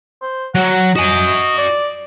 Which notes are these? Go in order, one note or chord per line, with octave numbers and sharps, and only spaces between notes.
C5
F#3 F#5
F#4 D#5 G#5
D5